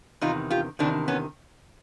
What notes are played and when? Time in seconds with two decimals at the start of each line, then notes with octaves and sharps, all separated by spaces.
0.21 E2 C3 D#3 D#4 F4
0.51 F4 G4
0.79 E2 C3 D#3 C4 D4
1.08 B3 C#4